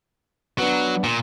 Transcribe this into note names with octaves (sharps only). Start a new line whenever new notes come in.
F#3 B3 D4
A#2